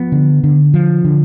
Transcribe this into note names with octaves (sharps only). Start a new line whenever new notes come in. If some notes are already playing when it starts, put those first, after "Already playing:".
Already playing: F3 B3
D3
D3
F3
D3